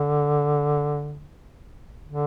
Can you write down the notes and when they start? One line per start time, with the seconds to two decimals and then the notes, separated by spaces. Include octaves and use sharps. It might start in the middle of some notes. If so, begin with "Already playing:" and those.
Already playing: D3
2.08 D3